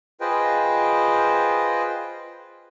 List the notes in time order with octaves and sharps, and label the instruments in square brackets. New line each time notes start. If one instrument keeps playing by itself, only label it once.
[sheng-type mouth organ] F4 G#4 B4 C5 D#5 G5